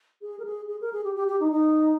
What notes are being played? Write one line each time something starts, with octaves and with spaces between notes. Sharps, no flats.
G#4
A#4
G#4
G#4
A#4
G#4
G4
G4
G4
D#4
D#4